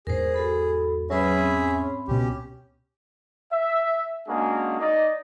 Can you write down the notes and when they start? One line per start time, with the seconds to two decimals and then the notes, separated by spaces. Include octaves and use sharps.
0.07 E2 G#2 G#4 A#4 C5
0.34 F#4 A4 B5
1.10 F#3 C#4 G#4 B4 E5 B5
1.38 C4 B5
2.08 C#2 B2 C#4 G4
3.53 E5
4.28 G#3 A#3 C#4 D4 F#4 G#4
4.80 D#4 D5 D#5